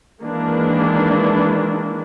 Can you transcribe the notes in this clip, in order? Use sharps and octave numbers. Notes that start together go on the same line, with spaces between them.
D#3 E3 G#3 A#3 D4 E4